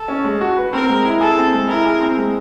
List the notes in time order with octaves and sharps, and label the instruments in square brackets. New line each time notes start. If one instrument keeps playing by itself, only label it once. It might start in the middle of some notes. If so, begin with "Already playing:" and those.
Already playing: [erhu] A4
[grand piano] C#4
G#3
F#4
B4
[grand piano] C4 [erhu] A#4
[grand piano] G#3
E4
[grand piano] G#4 [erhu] A4
[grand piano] C4
G#3
[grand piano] E4 [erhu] A#4
[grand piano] G#4
C4
G#3